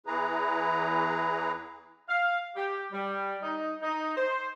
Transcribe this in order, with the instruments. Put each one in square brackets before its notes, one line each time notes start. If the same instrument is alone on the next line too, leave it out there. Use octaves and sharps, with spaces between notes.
[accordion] E2 E3 E4 G#4 B4 A#5
[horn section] F5
G4
G3
D#4
D#4
C5